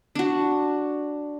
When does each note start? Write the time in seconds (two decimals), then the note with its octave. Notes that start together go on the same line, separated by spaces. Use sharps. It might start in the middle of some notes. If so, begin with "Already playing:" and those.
0.15 D4 F#4